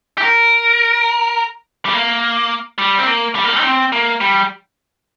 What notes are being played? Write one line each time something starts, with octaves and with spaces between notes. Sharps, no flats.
G4
A#4
G3
A#3
G3
C4
A#3
G3
A#3
G3
D#4
C4
A#3
G3